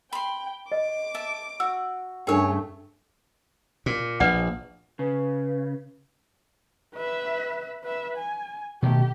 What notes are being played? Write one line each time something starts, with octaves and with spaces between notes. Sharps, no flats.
G5 B5 C6
D#5 D6
E5 A5
F#4 E6
G2 C#3 A3 D4 G#4 A#4 C#5 G5
A#2
A#1 B4 D5 F#5
C#3 B4
B4 E5
B4 E5
G#5
B2 D#3 A3 G4